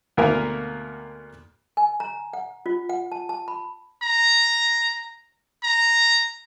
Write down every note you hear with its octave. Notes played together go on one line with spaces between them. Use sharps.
D2 B2 A#3 A#4 E5 G#5
G#5
A#5
F#5
F4
F#5
A5
A5
B5
A#5
A#5